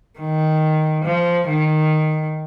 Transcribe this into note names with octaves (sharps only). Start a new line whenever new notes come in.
D#3
F3
D#3